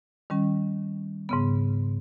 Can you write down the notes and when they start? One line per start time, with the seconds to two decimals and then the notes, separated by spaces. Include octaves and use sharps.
0.30 D#3 G3 C#4
1.29 G#2 C#3 B3